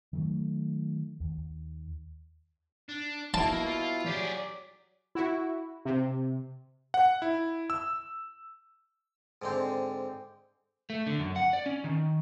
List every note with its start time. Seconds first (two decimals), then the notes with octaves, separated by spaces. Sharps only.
0.13 D#3 F#3 G3 A3
1.20 D#2
2.89 D4
3.34 B2 A#3 E4 A5
3.67 F4
4.06 F#3 G4 G#4 D5
5.15 E4 F#4
5.85 C3
6.94 F#5
7.22 E4
7.70 E6
9.42 G#2 D3 C4
10.90 A3
11.07 D3
11.19 F#2
11.36 F#5
11.53 D5
11.66 C#4
11.84 D#3